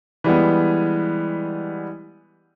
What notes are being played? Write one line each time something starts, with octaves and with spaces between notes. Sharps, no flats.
E3 G3 G#3 B3